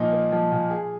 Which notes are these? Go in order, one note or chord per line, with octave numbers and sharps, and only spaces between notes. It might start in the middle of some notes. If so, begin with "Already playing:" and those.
Already playing: A#2 F3 A#3 D#4
A#3
F3
A#2
G#4